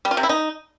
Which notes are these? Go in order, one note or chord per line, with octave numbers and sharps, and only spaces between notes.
G3
F4
C3
E4
D#4